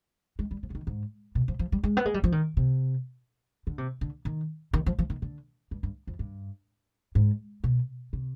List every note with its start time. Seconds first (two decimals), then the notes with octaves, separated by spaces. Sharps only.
0.39 G#3
0.51 G3
0.63 F3
0.70 D3
0.75 D#3
0.87 G#2
1.35 B2
1.48 F3
1.59 F3
1.72 G3
1.84 G#3
1.97 B3
2.06 G#3
2.14 G3
2.24 F3
2.32 D#3
2.57 C3
3.67 D3
3.78 C3
4.01 D3
4.25 D#3
4.73 D#3
4.86 F3
4.99 F3
5.10 D#3
5.22 D3
5.71 G2
5.83 G2
6.07 F2
6.19 G2
7.15 G#2
7.64 B2
8.13 C3